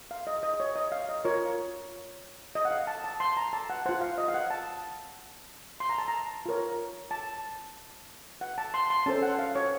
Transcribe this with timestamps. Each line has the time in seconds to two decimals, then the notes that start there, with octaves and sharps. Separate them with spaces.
0.11 F5
0.27 D#5
0.43 D#5
0.54 D#5
0.60 C#5
0.76 D#5
0.92 F5
1.09 D#5
1.25 F4 A#4 C#5
2.55 D#5
2.65 F#5
2.71 F5
2.87 A5
3.04 A5
3.20 C6
3.37 A#5
3.53 A5
3.70 F#5
3.86 F4 C5 F#5
4.01 F5
4.18 D#5
4.28 F5
4.34 F#5
4.50 A5
5.80 C6
5.90 A#5
5.98 A5
6.08 A#5
6.46 F4 A#4 C#5
7.11 A5
8.41 F#5
8.58 A5
8.74 C6
8.90 C6
9.06 C#4 A4 C5 A5
9.23 F#5
9.39 F5
9.55 C#5